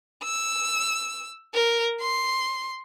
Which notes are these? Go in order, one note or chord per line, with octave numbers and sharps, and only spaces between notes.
E6
A#4
C6